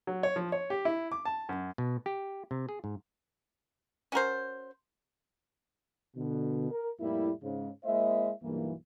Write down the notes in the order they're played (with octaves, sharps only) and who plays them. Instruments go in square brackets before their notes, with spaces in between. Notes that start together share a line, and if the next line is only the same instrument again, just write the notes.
[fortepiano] F#3
C#5
F3
C#5
G4
E4
D6
A5
F#2
[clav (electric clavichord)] B2
G4
C3
G#4
G#2
[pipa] C#4 F#4 A#4 C5
[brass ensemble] B2 D3
A#4
F2 A2 G3 A#3 E4
G#2 C#3
G#3 A#3 E4 C5 D#5 E5
B1 G2 E3 A#3